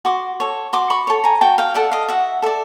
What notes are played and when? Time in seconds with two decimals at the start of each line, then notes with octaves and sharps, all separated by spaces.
0.05 F#4 C6 D6
0.40 A4 C#5
0.73 F#4 C6 D6
0.90 B5 C#6
1.07 A4 C#5
1.24 G#5 A#5
1.41 F#4 G5 A5
1.58 F5 G5
1.74 A4 D5 E5 F#5
1.91 D#5 F5
2.08 F#4 E5 F#5
2.42 A4 D5 E5